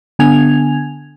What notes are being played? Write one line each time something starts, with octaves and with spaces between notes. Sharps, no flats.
D3 B3 D4 G#5 G#6 F7